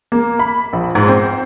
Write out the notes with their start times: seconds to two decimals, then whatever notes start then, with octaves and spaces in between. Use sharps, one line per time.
0.12 A#3
0.39 B5
0.73 A#1
0.95 G#2
1.08 C4